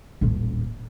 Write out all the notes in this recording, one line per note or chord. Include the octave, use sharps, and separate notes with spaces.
D#1 A1